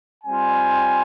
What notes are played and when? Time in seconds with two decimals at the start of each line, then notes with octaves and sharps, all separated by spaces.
0.24 G3 C4 F4 G#5